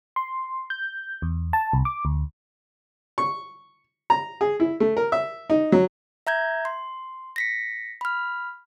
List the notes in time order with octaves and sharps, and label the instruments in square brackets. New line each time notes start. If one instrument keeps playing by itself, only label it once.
[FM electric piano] C6
G6
E2
A5
C2
D6
D2
[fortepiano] C#6
A#5
G#4
E4
A3
A#4
E5
D#4
F#3
[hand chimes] E5 A#5 G6 G#6
C6
A#6 B6 C#7
B5 F6